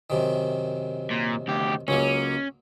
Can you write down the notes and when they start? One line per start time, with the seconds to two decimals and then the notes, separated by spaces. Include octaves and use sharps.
0.10 F#2 C3 D#3
1.11 A#2
1.48 D2 G4
1.88 C#2 F#3 A#3 C#4